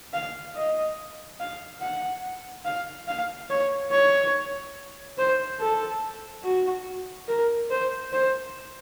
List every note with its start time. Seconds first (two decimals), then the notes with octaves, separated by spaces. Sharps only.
0.13 F5
0.55 D#5
1.40 F5
1.81 F#5
2.65 F5
3.08 F5
3.50 C#5
3.91 C#5
5.18 C5
5.60 A4
6.44 F#4
7.28 A#4
7.70 C5
8.13 C5